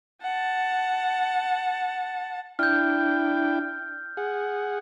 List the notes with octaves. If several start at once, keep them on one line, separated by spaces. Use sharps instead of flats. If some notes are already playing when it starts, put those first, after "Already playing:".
F#5 A5
D4 E4 G5 F6 G6
G#4 F#5